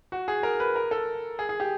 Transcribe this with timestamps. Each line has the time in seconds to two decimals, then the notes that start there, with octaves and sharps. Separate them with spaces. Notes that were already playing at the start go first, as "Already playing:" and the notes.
0.12 F#4
0.28 G#4
0.43 A#4
0.60 B4
0.76 A#4
0.91 A4
1.39 G#4
1.49 G#4
1.60 G4